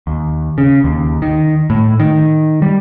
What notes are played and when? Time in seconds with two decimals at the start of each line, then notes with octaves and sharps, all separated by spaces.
0.07 D#2
0.58 C#3
0.84 D#2
1.22 D#3
1.70 A2
2.00 D#3
2.62 G3